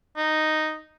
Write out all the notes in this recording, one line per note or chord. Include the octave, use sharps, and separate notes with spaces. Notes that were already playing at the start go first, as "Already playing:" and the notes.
D#4